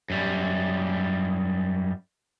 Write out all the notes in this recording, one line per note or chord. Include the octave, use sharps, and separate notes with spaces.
F#2 G3